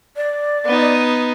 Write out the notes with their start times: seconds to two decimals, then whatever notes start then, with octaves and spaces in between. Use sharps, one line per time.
0.16 D5
0.65 B3 D#4